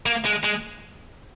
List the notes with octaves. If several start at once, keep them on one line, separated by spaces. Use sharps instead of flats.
A#3
G#3
G#3